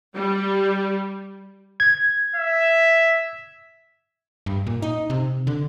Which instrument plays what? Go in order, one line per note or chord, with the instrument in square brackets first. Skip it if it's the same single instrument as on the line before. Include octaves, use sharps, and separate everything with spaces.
[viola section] G3
[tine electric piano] G#6
[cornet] E5
[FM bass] G2
A#2
D#4
C3
D3